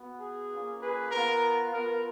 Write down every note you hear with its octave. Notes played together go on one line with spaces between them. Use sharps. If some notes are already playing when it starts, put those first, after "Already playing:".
Already playing: B3 F#4
G#4
A#3 C#4 F4
G#4 B4
B3 F4 A#4
B3 F4 A#4